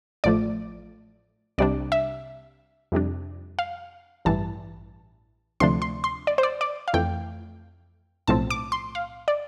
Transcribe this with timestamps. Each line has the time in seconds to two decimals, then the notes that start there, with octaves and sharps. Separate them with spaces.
0.24 A1 A2 F3 A3 D5
1.58 C2 C3 G3 D4 D5
1.92 E5
2.92 F2 C3 G3 D4
3.59 F5
4.25 A1 G2 E3 G3 A5
5.60 D2 C3 F3 A3 D4 C6
5.82 C6
6.04 C6
6.27 D5
6.38 C5
6.43 D5
6.61 D5
6.88 F5
6.94 F2 E3 A3 G5
8.27 B1 A2 F3 C4 A5
8.50 D6
8.72 C6
8.95 F5
9.28 D5